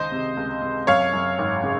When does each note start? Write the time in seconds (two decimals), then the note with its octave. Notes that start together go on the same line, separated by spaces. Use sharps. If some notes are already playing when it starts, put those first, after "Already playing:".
Already playing: C#2 D#3 C5 D#5
0.12 C3
0.37 C#2
0.62 C3
0.87 F#2 C#5 F5
1.13 F#2
1.39 G#1
1.63 C#3